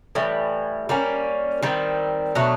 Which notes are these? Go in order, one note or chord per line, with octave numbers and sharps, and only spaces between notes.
A2 E3 G3
G3 A#3 C#4
D#3 G3 C4
B2 F#3 A3 D4